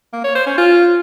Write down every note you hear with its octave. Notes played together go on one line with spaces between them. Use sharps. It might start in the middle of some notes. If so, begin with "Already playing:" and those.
A#3
C#5
C5
C#4
F4